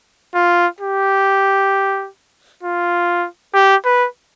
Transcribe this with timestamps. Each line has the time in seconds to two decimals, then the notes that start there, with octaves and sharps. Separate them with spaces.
0.34 F4
0.81 G4
2.63 F4
3.54 G4
3.85 B4